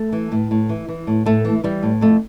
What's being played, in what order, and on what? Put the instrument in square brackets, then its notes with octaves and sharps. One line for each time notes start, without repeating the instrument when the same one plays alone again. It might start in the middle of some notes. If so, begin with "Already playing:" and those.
Already playing: [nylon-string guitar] A3
E3
A2
A2
E3
E3
A2
A2 A3
E3
E3 G3
A2
F2 A3